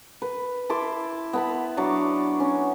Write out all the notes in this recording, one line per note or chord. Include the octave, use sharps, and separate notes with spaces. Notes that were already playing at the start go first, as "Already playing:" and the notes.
B4
E4 A5 C6 D6
B3 A5 B5
F#3 D4 C#6 D6
C#4